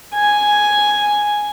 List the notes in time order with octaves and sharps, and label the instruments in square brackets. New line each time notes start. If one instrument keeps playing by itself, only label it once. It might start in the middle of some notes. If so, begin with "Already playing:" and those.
[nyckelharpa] G#5